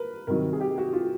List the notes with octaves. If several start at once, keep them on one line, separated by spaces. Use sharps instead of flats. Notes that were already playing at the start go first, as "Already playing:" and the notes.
Already playing: A#4 B4
C3 D#3 F#3 A#4
G#4
G4
F#4
F4